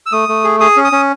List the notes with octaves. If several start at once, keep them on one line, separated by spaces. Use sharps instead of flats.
E6
A3 D#6
A3
G#4
G#4 D#6
C#4
D#6
C#4